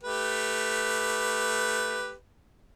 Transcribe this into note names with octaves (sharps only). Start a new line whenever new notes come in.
A3 G4 B4